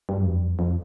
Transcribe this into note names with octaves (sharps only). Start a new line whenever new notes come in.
G2
F#2
F2
F2